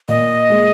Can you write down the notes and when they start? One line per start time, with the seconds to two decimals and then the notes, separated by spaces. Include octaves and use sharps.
0.08 A#2 D#5
0.50 G#3